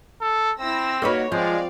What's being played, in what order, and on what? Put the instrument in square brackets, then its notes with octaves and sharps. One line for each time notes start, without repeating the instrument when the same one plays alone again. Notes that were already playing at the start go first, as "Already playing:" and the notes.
[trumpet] A4
[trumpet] C4 [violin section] E4 E6 A#6
[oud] A#3 D#4 B4 [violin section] F#4 C#5
[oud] F3 [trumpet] G#3 [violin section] C4 D5 F5